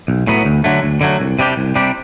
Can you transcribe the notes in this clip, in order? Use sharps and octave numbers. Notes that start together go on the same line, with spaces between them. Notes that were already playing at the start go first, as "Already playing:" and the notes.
B1
A2 F#3 B3
D2
D3 F#3 A3
D2
D3 F#3 A3
C2
C3 G3 D4 G4
C2
C3 G3 D4 G4